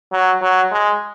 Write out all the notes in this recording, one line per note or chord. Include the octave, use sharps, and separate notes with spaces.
F#3
F#3
G#3